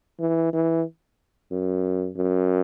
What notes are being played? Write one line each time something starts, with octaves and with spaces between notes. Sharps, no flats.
E3
E3
F#2
F#2